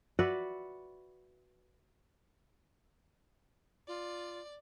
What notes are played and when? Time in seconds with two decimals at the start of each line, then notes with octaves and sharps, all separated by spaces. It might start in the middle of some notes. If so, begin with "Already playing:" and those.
0.19 F#4 B4 D5 E5
3.88 F4 D5